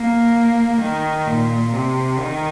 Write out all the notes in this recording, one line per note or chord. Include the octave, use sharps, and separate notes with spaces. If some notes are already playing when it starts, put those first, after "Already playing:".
Already playing: A#3
D#3
A#2
C3
D#3